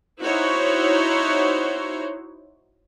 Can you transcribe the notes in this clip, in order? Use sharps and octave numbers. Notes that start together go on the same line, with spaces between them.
D#4 E4 F#4 C5 C#5